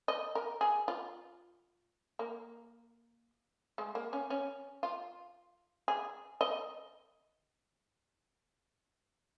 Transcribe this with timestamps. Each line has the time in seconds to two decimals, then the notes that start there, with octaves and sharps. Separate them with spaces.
0.08 D#5
0.35 A#4
0.61 G#4
0.88 F4
2.19 A#3
3.78 G#3
3.95 A#3
4.13 C#4
4.30 C#4
4.83 F4
5.88 G#4
6.41 D#5